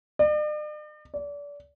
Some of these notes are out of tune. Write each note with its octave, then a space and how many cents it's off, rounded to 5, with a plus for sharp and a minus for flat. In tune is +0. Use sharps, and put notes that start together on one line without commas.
D5 +45
D5 -30